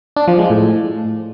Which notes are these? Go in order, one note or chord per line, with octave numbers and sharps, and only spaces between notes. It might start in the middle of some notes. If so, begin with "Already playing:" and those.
D4
F3
G#3
A2